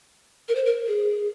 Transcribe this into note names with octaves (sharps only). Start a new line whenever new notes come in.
A#4
C5
A#4
G#4